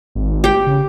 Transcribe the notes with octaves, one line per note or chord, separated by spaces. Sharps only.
G#1
G4 G5
C#3